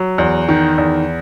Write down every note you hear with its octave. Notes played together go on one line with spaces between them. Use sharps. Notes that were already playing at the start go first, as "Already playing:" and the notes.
Already playing: F#3
E2
D#3
E2